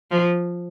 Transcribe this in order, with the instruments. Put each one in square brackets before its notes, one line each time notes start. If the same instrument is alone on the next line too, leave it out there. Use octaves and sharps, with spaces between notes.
[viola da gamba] F3